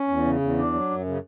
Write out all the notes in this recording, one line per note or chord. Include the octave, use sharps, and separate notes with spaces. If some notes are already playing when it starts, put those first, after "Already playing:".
Already playing: C#4
E2
C#3
E2
D4
F#3
F#2
C#3